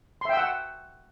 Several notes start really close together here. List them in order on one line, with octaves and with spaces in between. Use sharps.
C6 E5 G5 E6 F#5